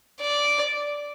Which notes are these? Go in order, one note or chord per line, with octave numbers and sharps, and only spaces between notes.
D5